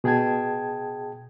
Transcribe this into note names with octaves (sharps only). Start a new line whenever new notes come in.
B2 G#4 G5 A5 G#6